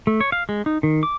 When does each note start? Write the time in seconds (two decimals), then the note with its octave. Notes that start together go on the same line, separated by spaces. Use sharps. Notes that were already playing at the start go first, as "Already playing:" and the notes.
0.07 A3
0.21 C#5
0.32 F5
0.49 G#3
0.66 D#4
0.83 D#3
1.03 D6